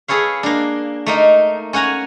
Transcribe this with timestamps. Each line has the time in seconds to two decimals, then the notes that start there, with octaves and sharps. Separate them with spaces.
0.08 G#4 A4 B4 C#5 F5
0.43 A#3 D4
1.06 A3 A#3 D#4
1.73 C#4 C#5 F#5 G#5 A#5